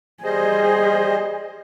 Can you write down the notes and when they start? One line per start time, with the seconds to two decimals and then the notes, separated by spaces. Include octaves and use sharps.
0.24 G3 G#4 C5 D#5